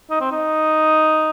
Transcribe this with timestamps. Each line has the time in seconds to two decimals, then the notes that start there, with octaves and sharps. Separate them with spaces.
0.10 D#4
0.21 C4
0.32 D#4